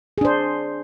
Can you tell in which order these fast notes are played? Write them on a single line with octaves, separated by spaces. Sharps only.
G#4 D4 C5